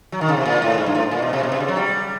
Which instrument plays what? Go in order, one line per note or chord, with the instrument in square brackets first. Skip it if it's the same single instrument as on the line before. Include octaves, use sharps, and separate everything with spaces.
[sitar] F#3
D#3
C#3
C3
A#2
A2
G#2
G2
A2
A#2
B2
C3
B2
C3
C#3
F#3
G3